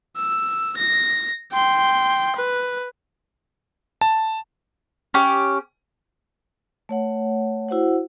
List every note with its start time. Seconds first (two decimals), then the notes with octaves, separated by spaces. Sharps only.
0.16 E6
0.77 A#6
1.53 G5 C6
2.37 B4
4.01 A5
5.14 C#4 G4
6.89 A3 C#5 F#5
7.69 E4 F#4 C5 F#5